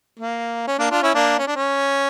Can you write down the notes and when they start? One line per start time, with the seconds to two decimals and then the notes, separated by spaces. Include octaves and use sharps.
0.19 A#3
0.67 C#4
0.78 A#3 D4
0.91 D4 F4
1.02 C#4 E4
1.14 A#3 D4
1.38 C#4
1.47 D4
1.56 C#4